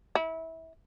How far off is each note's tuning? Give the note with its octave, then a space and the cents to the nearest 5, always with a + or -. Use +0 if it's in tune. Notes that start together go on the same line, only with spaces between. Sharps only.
E4 -25